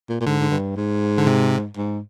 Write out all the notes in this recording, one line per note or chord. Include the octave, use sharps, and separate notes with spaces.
A#2
A#2
G#2 D3
G#2
G2
G#2
D3
C3
G#2